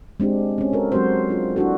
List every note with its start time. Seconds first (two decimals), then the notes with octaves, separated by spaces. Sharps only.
0.20 G#3 C4 D4 G4
0.58 C4 C#4
0.73 F#4 A4 A#4
0.92 F#3 G#3 C4 F#4 G4 C5
1.29 D4 F4 G#4
1.56 D4 E4 F#4 A4